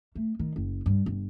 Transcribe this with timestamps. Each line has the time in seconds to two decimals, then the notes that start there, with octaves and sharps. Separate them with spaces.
0.15 A3
0.39 D#3
0.56 F#1
0.86 G2
1.06 G1